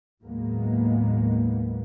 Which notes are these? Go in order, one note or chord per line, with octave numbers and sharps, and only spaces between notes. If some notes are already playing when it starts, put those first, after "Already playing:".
D#2 A2 F#3 G#3 A#3 B3